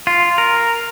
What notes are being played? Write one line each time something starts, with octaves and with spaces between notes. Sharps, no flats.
F4
A#4